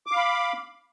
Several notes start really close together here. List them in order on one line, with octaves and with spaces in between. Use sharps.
D6 F5 B5